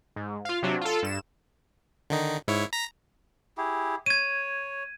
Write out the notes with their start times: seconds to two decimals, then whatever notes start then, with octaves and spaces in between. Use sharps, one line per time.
0.16 G#2
0.45 F4 F5
0.63 C3 F#3 D4
0.81 F4 A4
1.03 G2 E7
2.10 D3 D#3 D#4
2.48 G#2 E4 C#5
2.73 A#5 A#6 B6
3.58 E4 G4 G#4
4.06 C#5 G#6 D#7